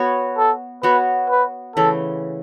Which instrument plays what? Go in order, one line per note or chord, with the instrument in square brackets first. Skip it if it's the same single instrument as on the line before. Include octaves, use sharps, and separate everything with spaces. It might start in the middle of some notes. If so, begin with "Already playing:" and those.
Already playing: [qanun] B3 F#4 C#5
[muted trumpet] A4
[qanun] B3 F#4 C#5 [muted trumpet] B4
[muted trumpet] B4
[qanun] C#3 E3 A3 [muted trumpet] A4